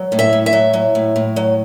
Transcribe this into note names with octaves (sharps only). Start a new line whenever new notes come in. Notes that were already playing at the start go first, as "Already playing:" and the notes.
Already playing: F#3
A2
E5
A2
E5
F#3
F#3
A2
A2
F#3